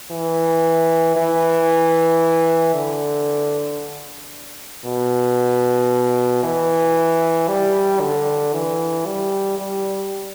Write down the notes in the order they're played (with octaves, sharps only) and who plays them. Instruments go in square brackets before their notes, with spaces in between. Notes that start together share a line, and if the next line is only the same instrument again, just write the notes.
[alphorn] E3
E3
D3
B2
E3
G3
D3
E3
G3
G3